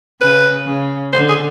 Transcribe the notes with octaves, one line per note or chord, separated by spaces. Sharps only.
C#3 B4
C#3
D3 C5
G#4